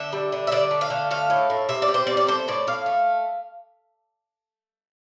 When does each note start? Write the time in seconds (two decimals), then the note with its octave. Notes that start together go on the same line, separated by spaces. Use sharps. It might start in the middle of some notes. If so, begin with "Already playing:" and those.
Already playing: D3 E5
0.13 G3
0.32 D3
0.47 E5
0.51 D3 D5
0.71 A3
0.81 F5
0.90 D3
1.11 A3 F5
1.30 A2
1.50 A2
1.69 C3 E5
1.82 D5
1.88 G3
1.94 C5
2.07 C3 D5
2.17 D5
2.27 A3 C5
2.48 A2 D5
2.67 A2 F5
2.86 A3